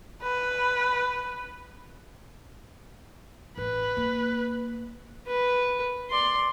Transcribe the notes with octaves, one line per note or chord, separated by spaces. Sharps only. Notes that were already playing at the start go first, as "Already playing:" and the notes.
B4
A1 B4
A#3
B4
D5 C6